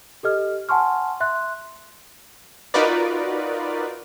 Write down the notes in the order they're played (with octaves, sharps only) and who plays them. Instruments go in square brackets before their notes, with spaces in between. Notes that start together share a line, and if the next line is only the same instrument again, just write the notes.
[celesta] G4 A4 D#5 F6
F#5 G#5 A5 C6 C#6 F6
E5 C6 F#6
[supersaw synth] D#4 F4 F#4 A#4 B4 D5